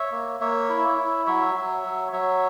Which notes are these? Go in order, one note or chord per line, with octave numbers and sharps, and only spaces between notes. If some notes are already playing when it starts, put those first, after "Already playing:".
Already playing: C#5 E5
A#3
A#3 C#5 E5
E4
E4
F#3 C#5 E5
F#3
F#3
F#3 C#5 E5